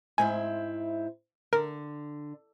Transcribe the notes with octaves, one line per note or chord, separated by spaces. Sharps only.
G#2 C4 E4 G#5
D3 A#4